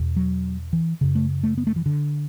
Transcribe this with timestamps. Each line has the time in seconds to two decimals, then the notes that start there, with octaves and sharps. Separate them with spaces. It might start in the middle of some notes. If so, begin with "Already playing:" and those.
Already playing: E2 B2
0.16 F#3
0.73 E3
1.01 F#2 C#3
1.15 A3
1.43 A3
1.58 B3
1.67 A3
1.76 E3
1.86 D3